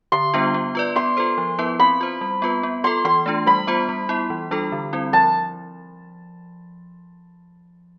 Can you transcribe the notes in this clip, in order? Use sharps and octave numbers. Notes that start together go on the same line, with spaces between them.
D3 C6
G3 B3 D4 F4
B3
F4 B4 D5
B3 C6
F4 A4 C5
F3
B3 E4 B4
C4 B5
F4 C5
G3
B3 F4 B4
B3
F4 A4 C6
E3 C6
A3 D4 F4
G3 B5
B3 F4 C5
G3
B3 E4
E3
G3 D4 F4 A4
D3
G3 C4 E4
F3 A5